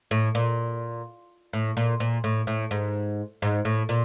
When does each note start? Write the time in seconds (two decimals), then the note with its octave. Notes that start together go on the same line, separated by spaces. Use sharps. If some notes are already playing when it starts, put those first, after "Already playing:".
0.11 A2
0.35 A#2
1.53 A2
1.77 A#2
2.00 A#2
2.24 A2
2.47 A2
2.71 G#2
3.42 G#2
3.65 A2
3.89 A#2